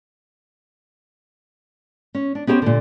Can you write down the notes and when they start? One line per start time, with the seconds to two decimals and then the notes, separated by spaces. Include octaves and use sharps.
2.15 C#4
2.35 D4
2.47 B3 C#4 G4 A4 C5 G5
2.62 A#2 D3